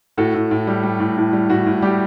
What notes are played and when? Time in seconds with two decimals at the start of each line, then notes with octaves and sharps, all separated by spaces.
0.18 A2 F#4 A4
0.34 A2
0.51 A2
0.67 G3
0.83 G3
1.00 A2
1.17 A2
1.33 G3
1.49 A2 F#4
1.66 A2
1.82 G3 G4